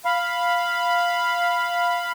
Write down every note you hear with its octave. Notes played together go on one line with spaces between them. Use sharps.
F5 B5